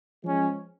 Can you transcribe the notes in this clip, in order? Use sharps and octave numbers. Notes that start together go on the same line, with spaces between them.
F3 G#3 C#4